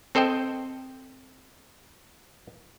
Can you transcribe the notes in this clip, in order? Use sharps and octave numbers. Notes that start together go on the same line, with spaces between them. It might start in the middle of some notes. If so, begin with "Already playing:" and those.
C4 A4 C5 D#5 G5